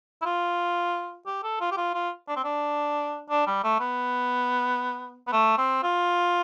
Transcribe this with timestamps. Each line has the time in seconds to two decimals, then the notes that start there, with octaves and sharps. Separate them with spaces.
0.22 E4
0.25 F4
1.27 G4
1.43 A4
1.61 F4
1.72 G4
1.77 F4
1.94 F4
2.28 D4
2.36 C4
2.44 D4
3.30 D4
3.47 G3
3.64 A3
3.80 B3
5.27 B3
5.32 A3
5.58 C4
5.83 F4